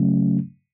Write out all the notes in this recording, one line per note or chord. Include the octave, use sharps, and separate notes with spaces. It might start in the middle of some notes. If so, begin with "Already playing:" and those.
Already playing: C#3 F#3 A3 C#4